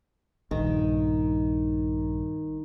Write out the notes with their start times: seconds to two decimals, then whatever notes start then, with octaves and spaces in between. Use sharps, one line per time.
0.51 A#1 G2 D#3